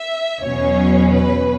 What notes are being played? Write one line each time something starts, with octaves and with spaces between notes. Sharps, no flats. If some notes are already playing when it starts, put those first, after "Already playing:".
Already playing: E5
E2 B2 F#3 C#4 C#5
B4